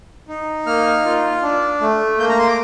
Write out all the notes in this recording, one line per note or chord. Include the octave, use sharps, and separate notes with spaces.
D#4
A#3 F6
F4
D4
A3
A#3 G6
A#5
C6
D6